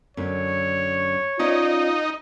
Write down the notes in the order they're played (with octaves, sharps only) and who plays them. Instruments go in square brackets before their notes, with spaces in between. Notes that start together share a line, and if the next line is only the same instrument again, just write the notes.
[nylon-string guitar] F#2 D3 [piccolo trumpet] C#5
[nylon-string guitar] C#4 D5 E5 [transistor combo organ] D#4 [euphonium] F4